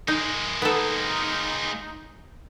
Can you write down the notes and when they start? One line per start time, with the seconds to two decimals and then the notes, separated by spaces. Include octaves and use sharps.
0.08 G#3 A#3 D#4
0.62 B3 D#4 A4